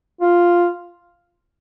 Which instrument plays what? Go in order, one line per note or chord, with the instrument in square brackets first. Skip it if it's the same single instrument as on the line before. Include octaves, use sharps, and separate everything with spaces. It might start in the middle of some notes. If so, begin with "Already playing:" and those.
[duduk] F4